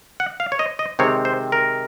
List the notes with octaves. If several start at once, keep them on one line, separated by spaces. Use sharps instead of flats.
F#5
F5
C#5
D#5
D#5
C3 D#3 G#3 C4 C#5
C5
A#4